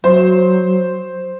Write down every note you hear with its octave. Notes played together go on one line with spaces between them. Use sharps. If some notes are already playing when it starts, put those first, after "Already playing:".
F#3 C5